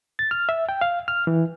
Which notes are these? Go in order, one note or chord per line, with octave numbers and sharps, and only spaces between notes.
A6
F6
E5
G5
F5
F6
E3